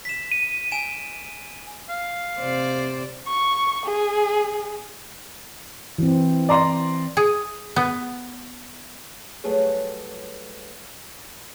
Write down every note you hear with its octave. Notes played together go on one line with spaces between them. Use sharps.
B6 E7
D#7
G#5 D7 E7
F5
C3 C5 D5
C#6
G#4
E3 C4
D5 A#5 C6
G#4
B3
F#3 G3 A3 G#4 B4 C#5